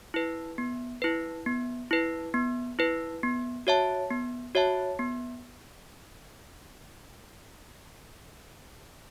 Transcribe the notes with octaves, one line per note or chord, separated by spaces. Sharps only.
E4 B4
B3
E4 B4
B3
E4 B4
B3
E4 B4
B3
F#4 C#5 E5 A5
B3
F#4 C#5 E5 A5
B3